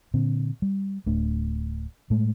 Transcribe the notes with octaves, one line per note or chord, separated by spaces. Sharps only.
A#2 D3 C4
G3
D1 A3 D4
A2 G#3 A3